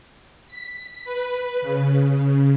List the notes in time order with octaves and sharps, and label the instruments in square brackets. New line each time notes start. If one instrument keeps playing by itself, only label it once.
[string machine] B6
B4
C#3